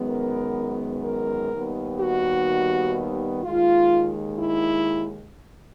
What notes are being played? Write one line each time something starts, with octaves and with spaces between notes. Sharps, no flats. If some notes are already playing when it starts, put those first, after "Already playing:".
Already playing: F#2 D#3 G#3 B3
A#4
A#4
D#2 D#3 G3 B3
F#4
D#2 D#3 G#3 F4
E4